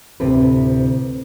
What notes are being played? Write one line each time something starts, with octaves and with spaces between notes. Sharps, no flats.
D2 A2 C3 C4 A4 B4